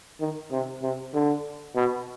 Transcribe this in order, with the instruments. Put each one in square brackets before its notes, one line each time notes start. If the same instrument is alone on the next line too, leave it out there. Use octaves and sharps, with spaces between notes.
[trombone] D#3
C3
C3
D3
B2